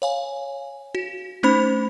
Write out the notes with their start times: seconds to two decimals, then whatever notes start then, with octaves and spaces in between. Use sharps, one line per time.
0.02 C#5 F5 G#5
0.95 F#4
1.43 A3 C#4 D#4 C5 B5 F7